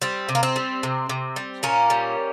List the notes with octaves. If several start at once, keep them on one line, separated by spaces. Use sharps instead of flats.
G3 C4
C3
A#3
C4
G3
C3
C3
G3
A#2 A#3 C#4
G3